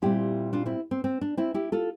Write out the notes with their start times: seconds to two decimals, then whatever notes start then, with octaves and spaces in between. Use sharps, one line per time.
0.02 A#2 G3 C4 E4 G4
0.53 D4 F4
0.66 C4 E4
0.91 C4
1.04 C4
1.21 D4
1.37 C4 E4
1.54 E4 G4
1.72 F4 A4